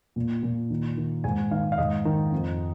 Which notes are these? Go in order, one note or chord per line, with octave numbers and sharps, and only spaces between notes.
A#2
A#2
D#3
D#3
G#2 G#5
D#3 F5
F5
G#2 D#5
D#3
F2